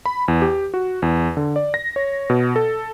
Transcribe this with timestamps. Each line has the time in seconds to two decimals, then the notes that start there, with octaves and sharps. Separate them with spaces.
0.06 B5
0.28 E2
0.42 G4
0.74 F#4
1.02 E2
1.37 D3
1.56 D5
1.74 A#6
1.96 C#5
2.30 B2
2.56 A4